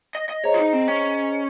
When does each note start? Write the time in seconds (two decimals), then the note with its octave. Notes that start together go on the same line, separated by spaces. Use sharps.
0.15 D#5
0.29 D#5
0.44 G#4 C5 C#5 D#5 A#5
0.54 F4
0.59 D#4
0.73 C4
0.88 C#4